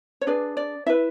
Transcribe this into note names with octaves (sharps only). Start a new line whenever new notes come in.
C#5
D4 G#4 B4 D5
D5
E4 B4 E5